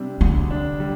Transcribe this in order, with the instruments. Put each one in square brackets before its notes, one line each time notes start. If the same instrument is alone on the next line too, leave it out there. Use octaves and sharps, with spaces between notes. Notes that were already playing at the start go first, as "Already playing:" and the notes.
Already playing: [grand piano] C3 G3 D4
[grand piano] D2 [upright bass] G#3
[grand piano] D4
G3